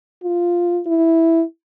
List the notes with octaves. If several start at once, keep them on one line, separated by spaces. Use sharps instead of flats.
F4
E4